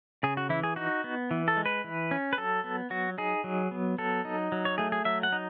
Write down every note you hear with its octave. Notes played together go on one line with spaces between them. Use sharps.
C#3 G#4
F#4
E3 E4
G#4
D#4 F#4
B3
E3
A4
G#3
B4
E3
C#4
B4
F#3 A4
B3
F#3 F#4
D#4 G#4
F#3
B3
F#3 A4
D#4
F#3
C#5
A3 G#4
G#4
F#3 E5
F#5
D#4